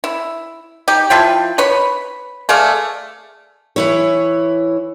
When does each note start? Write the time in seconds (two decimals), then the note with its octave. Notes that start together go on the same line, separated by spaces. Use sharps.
0.04 E4
0.88 D#4 G4
1.10 F3 E4 F4 G5
1.58 B4 C#5 B5
2.49 A3 G#4 D5 F5
3.76 E3 E4 C#5